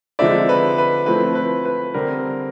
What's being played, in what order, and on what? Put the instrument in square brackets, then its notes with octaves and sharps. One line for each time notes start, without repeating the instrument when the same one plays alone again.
[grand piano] D3 F3 G#3 C4 D#4 D5 E5
B4
B4
F3 A3 C4 E4 B4
B4
B4
D3 G3 C4 A#4